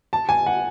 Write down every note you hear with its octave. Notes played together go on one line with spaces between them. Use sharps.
A5
G#5
F#5